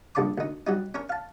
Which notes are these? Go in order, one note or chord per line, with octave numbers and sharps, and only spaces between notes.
A#1 G2 C#3 A5 C6 D6
D2 D#4
F#3 G3 D#4
C#4 A#4 C#5
F5 A5